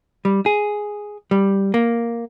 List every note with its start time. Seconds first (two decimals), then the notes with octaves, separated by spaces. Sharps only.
0.25 G3
0.46 G#4
1.31 G3
1.74 A#3